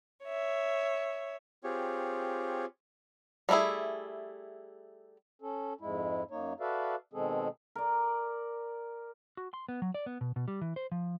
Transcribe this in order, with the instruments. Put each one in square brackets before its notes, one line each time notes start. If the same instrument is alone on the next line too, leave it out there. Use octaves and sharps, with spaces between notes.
[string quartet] C#5 E5
[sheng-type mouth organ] C4 F4 G4 G#4 C#5
[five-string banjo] G3 A3 C#4 E4 G#4
[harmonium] C#4 A4
F2 G#2 G#3 E4
F#2 A#3 D#4 C#5
F#4 A4 B4 D5 E5 F5
B2 D#3 G#3 C4 G#4 A4
[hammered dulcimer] A#4 D5
[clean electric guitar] F#4
C6
B3
F#3
D5
B3
B2
B2
G3
E3
C5
F3